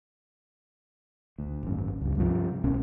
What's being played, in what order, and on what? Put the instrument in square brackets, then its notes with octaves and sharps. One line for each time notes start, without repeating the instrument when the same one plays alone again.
[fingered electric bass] D2
G#1 F#2
C#2 G2
G2 C3 F3
C2 B2 C#4